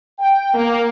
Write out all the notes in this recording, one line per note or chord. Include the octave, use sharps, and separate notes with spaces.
G5
A#3